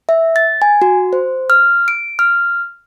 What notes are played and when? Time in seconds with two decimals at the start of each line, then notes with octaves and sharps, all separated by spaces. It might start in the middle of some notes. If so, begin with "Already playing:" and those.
0.09 E5
0.36 A6
0.62 G#5
0.82 F#4
1.13 C5
1.50 F6
1.88 D7
2.19 F6